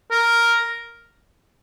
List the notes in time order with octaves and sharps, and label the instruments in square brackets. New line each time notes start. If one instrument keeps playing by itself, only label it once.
[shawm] A#4